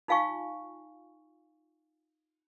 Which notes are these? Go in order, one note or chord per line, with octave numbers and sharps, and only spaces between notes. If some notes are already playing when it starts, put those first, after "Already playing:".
D#4 F4 F5 G#5 C#6